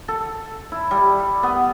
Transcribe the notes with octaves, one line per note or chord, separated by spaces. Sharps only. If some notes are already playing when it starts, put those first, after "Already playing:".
A4
E4
G3
B3